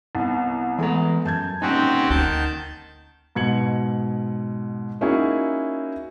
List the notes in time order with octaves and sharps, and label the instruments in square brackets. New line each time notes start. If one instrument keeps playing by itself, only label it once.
[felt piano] C2 B3
[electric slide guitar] E3 A#5 [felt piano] G#3 A3 B3
[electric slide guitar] F#2 [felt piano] A5 G6 G#6
[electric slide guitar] A#3 C#4 D#4 [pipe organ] C4 F#4 G4 [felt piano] G#5
[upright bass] D2 [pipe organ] D#3 A5 G6 [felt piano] F#5
[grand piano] G#2 B2 G#6 C#7 F#7
A#3 C#4 D#4 E4 F#4 G#4